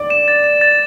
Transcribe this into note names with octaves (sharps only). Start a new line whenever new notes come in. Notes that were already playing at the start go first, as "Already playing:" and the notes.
Already playing: D5
E7
A6
E7
A6